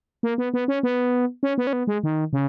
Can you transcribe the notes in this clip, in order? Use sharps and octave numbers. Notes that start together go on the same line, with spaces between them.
A#3
B3
B3
C#4
B3
C#4
B3
C#4
B3
G#3
D#3
C#3